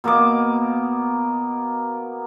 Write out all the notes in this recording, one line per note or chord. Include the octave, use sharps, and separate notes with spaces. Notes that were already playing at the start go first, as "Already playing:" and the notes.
B2 A#3 D#5 D6